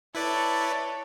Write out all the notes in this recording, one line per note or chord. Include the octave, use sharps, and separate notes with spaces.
E4 A4 B4 C#5 D5